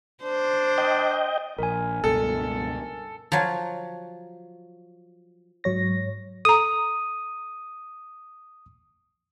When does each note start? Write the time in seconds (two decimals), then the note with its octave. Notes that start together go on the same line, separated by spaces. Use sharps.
0.23 D4 C5
0.78 D#5 G5
1.59 A#1 A#4 G#5
2.04 C#2 G2 B2 A4
3.32 F3 F#3
5.64 G#2 F#3 C#5 A#6
6.45 A4 A#5 D#6